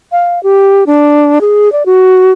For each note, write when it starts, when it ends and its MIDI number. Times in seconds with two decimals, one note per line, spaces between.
0.12 0.42 77
0.43 0.84 67
0.86 1.39 62
1.41 1.72 68
1.72 1.85 74
1.86 2.32 66